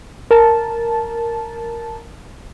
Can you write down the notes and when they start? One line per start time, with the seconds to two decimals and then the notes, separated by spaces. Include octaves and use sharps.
0.31 A#4 A5